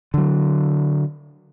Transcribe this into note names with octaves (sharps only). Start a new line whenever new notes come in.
D3 F#3